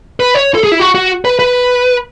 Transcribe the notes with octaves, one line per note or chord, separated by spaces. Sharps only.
B4
C#5
A4
G#4
E4
F#4
F#4
B4
B4